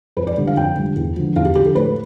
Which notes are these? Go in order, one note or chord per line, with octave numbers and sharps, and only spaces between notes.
F2 B4
D5
D3 G3
F5
F2 G5
D3 G3
E2
D3 F3
E2 F5
G4
D3 F3 G4
A4
A2 B4